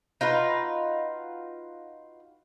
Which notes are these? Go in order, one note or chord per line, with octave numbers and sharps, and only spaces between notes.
D#4 F4 F#4 B4